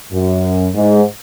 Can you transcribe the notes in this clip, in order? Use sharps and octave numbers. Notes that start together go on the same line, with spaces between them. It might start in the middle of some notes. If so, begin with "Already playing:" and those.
F#2
G#2